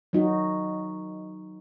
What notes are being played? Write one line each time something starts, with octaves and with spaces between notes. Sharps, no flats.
F#3 D#4 F#4